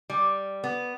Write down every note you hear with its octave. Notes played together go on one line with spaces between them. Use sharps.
G3
B3